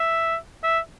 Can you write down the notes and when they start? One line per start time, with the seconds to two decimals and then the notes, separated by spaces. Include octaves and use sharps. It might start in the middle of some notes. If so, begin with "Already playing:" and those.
Already playing: E5
0.64 E5